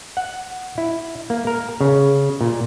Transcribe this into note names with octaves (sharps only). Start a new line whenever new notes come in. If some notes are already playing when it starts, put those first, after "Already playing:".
F#5
E4
A#3
A#4
C#3
A#2